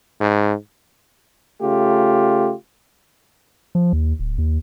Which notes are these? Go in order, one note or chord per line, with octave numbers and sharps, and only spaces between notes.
G#2
C#3 A3 F4 G4
F3
D#2
D1
D#2